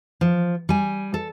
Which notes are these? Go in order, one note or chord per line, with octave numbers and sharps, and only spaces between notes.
F3
G3 G#5
A4